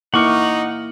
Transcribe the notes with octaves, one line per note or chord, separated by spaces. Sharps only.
A#3 D#4 E4 F#5 C#6 D6 F6 C#7